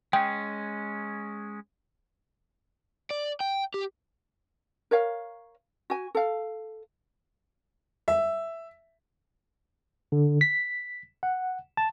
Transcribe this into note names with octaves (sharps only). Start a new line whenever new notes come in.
G#3 C#4 G5
D5
G5
G4
A#4 C#5 F5
F#4 G#5
A4 F5
E5
D3
B6
F#5
A5